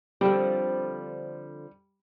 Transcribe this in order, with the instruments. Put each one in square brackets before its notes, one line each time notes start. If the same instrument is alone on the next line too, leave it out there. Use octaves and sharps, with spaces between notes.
[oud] D3 F3 C4 [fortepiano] G3